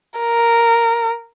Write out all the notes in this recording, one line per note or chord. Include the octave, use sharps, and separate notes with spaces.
A#4